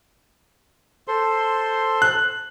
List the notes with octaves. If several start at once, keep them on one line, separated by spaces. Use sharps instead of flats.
A4 C5 C6
F#6